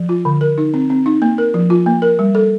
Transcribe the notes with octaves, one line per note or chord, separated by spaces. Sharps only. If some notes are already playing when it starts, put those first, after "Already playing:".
Already playing: F3
F4
D3
A#4
D#4
C4
C4
D#4
A#3
A#4
F3
F4
A#3
A#4
G3
A4